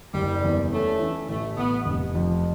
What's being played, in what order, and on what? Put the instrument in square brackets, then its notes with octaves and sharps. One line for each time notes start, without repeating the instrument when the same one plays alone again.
[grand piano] F#1 [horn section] G3
[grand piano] E2
[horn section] A3 [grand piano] C#4
[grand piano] E3
[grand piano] A1 [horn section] A3
[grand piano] A1 [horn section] B3
[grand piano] F1
F2